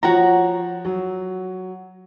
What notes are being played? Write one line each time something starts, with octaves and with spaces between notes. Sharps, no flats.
F3 F#4 C#5 F#5 A#5
F#3